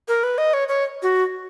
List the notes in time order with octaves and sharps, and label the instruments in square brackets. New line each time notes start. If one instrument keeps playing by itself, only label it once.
[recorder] A#4
B4
D#5
C#5
C#5
F#4